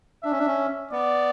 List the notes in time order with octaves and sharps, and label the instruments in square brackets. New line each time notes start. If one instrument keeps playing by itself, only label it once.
[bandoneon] D4 [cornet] E5
[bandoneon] C#4
D4
C#4
[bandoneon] B3 [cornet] D5